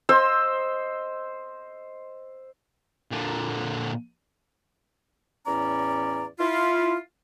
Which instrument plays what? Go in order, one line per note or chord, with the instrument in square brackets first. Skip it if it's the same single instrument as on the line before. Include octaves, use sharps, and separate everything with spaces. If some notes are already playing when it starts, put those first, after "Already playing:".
[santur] C5 D#5 C6 E6
[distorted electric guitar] A#2 D3
[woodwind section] E2 A2 C#4 D5 A#5
E4 F4